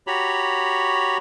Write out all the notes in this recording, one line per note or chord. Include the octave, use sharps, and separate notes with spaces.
F#4 G4 C#5 A#5 B5